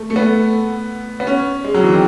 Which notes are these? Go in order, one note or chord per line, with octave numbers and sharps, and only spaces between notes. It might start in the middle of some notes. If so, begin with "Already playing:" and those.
Already playing: A3
A3
B3
B3
C#4
G#3
F#3
E3
D#3